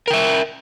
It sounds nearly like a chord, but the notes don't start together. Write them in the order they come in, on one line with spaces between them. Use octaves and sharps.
A#4 G5 E5